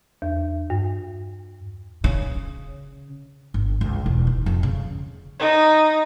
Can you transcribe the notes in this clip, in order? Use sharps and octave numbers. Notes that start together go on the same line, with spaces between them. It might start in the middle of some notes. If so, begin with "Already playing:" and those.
E2
G2
C#3
G1
C#2
E1
D#4
F2
C#3
D#4